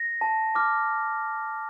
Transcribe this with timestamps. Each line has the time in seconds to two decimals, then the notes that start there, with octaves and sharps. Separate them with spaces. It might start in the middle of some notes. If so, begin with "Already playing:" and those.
Already playing: A#6
0.21 A5
0.55 D6 F6